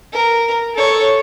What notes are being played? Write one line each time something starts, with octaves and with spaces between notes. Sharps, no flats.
A#4
A4 C#5